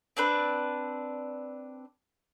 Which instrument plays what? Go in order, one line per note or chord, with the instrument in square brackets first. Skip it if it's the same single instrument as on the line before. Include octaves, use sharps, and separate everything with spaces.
[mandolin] C4 D4 B4